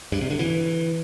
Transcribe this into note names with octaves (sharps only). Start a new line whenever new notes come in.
G2
C3
D3
E3